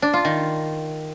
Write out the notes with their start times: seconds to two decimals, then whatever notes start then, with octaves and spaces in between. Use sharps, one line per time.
0.02 D4
0.14 F4
0.25 D#3